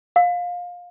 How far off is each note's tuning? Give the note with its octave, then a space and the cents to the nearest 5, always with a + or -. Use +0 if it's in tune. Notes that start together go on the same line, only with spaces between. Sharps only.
F5 +20